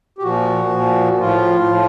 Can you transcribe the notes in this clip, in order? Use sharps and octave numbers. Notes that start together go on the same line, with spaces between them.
G4
A#2 F3 F#4
A#2 F3
A2 F3 F4
A2 F3